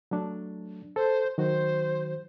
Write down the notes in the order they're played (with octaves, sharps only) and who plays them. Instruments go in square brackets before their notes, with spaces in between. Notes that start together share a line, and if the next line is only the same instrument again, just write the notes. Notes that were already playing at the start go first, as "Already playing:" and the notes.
[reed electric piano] F#3 A3 D4
[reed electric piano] A4 [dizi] C5
[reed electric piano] D#3 F#3 F#4 [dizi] C5